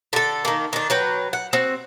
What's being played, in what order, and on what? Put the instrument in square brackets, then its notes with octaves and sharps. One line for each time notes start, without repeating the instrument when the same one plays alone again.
[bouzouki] D3 A4
D#3 A#3
D#3 D4
F#3 B4 G5
F#5
C4 F#4